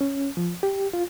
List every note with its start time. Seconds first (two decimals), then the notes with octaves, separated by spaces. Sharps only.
0.01 C#4
0.37 F3
0.63 G4
0.93 F4